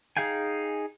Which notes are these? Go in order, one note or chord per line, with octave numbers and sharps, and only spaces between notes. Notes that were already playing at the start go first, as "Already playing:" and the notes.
D#4 G#4 F5 G5 G#5